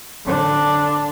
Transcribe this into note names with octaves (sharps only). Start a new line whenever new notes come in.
D3 D4